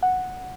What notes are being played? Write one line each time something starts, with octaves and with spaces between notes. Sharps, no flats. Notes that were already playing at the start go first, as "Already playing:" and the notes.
F#5